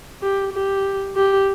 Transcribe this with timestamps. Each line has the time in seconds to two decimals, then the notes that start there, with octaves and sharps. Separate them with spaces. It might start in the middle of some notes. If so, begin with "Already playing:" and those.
0.22 G4
0.53 G4
1.16 G4